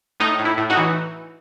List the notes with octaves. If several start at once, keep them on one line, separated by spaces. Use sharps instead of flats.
A2 D#4
A2
E4
A2
D#4 F#4
E3